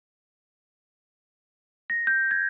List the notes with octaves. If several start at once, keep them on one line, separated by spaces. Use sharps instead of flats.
A#6
G6
G#6